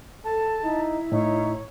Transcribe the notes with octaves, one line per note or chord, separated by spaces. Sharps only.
A4 A5
D#4 E4
A2 D#4 C#5